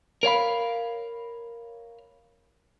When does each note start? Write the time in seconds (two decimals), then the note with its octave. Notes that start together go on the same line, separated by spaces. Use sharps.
0.23 A#4 C#5 F5 B5